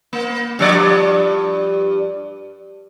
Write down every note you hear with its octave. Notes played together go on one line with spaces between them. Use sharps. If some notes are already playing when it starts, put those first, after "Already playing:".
A#3
G2 F3 D5